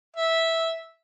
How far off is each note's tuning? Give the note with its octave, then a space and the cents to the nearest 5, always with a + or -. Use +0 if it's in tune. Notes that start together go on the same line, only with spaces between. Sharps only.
E5 -10